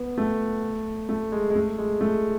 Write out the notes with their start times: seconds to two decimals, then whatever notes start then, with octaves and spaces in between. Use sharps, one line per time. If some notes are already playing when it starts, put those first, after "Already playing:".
Already playing: B3
0.18 A3
1.09 A3
1.32 G#3
1.50 G#3
1.55 A3
1.78 G#3
2.01 A3